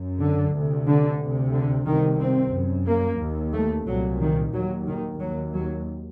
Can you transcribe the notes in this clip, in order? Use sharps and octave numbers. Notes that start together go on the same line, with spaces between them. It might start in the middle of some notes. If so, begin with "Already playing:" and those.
Already playing: F#2
D3
D2 C3
D3
D2 C3
D3
C2 C3 D#3
C4
F#2
A#3
D#2
A3
C2 A#2 F#3
D#3
D#2 F#3
D#3
D#2 F#3
F#3